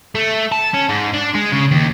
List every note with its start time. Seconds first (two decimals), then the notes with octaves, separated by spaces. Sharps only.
0.15 A3
0.52 A5
0.74 C#4
0.89 G#2
1.14 D4
1.35 G#3
1.52 C#3
1.71 D#2